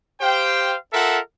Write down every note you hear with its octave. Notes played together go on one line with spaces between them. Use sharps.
G4 C5 F5 G5
F4 A4 A#4 E5 F#5